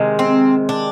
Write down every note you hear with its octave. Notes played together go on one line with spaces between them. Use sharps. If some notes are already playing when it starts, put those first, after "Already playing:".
Already playing: C3 D#3 G#3
C4
D4